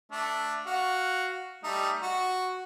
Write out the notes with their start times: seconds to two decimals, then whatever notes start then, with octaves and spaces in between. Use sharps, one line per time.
0.12 A3 D4
0.66 F#4 F5 F#5
1.64 G3 A3 D#4
2.02 F#4